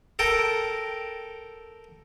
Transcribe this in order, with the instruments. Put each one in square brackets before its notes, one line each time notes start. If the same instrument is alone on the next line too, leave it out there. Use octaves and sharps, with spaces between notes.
[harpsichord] A4 A#4 G5